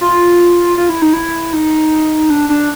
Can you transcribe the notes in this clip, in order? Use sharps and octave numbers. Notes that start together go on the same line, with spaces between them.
F4
F4
E4
D#4
E4
D#4
D4
D4